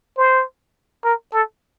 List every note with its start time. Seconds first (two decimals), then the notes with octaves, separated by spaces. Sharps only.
0.17 C5
1.04 A#4
1.33 A4